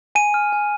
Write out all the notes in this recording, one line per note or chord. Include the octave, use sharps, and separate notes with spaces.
G#5 D#7
F6
G#5